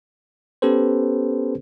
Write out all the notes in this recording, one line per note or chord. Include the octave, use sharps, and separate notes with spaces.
B3 C#4 G4 A4 B4 C5